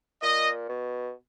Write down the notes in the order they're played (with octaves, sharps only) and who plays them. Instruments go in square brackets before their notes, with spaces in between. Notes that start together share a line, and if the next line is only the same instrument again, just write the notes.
[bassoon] A#2 [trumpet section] D#5
[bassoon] B2